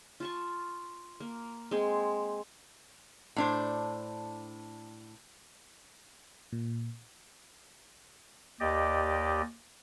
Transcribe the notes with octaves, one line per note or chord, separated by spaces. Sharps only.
F4 A5 C#6
A#3
G#3 C4 G#4
A2 D4 C5
A#2
D#2 G4 D5 D#5